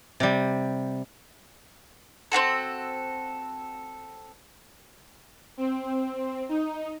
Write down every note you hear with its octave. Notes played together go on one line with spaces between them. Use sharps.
C3 G3
C4 F4 F#4 A4
C4
D#4